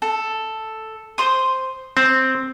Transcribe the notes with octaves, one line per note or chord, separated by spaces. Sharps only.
A4
C5 C6 D#6
C4 C5